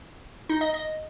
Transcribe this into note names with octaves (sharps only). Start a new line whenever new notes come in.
D#4
D#5
D#5